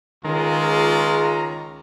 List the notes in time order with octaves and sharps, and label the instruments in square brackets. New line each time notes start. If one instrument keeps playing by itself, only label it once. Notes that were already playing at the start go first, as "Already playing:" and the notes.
[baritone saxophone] C#2 [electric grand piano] D#3 [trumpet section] G#3 F4 [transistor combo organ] A#5